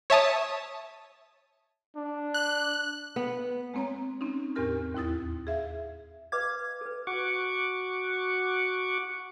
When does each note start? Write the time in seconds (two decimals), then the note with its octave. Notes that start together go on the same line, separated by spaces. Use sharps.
0.10 C#5 E5 A5 D#6
1.96 D4
2.34 F#6
3.16 B3
3.74 G#3 A#3 C4 C#5 A#5
4.21 C4 C#4 D#4
4.56 E2 A2 C4 G4 A#4 F6
4.94 D#2 C4 E4 D#6 A6
5.47 G#4 E5 F5
6.32 B4 D#5 F5 D6 G#6
6.81 A4 B4
7.07 F#4 F#5 C#6 D6